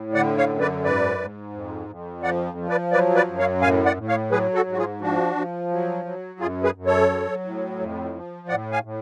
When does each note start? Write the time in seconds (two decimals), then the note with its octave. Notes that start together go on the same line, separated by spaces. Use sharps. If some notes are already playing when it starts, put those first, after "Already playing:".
Already playing: A2
0.14 D3 D5 F#5
0.37 C#5 F5
0.49 F#2
0.60 B4 D5
0.84 G#2 B4 D5
1.18 G#2
1.53 F2
1.89 F2
2.23 F3 D5 F#5
2.57 F3
2.69 B4 D5
2.92 F#3 B4 D5
3.15 B4 D5
3.28 F#2
3.38 C#5 F5
3.62 A2 F5 G#5
3.85 D5 F#5
3.97 A2
4.08 C#5 F5
4.31 F#3 G#4 B4
4.54 F#4 A4
4.66 G#2
4.72 F#4
4.78 F4 G#4
5.01 F3 D4 F#4
5.36 F3
5.71 F#3
6.05 F#3
6.40 F#2 F4 G#4
6.63 G#4 B4
6.75 F#2
6.86 A4 C#5
7.10 F#3
7.45 A2
7.80 F2
8.14 F3
8.48 A2 D5 F#5
8.72 F5 G#5
8.84 A2